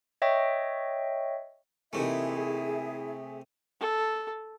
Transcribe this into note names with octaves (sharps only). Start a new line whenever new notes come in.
C#5 D#5 E5 G5 C#6
C3 E3 A3 A#3 D#4 E4 G#4 E5
A4